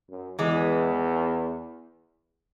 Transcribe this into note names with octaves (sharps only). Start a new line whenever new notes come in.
F#2
E2 E3 G#3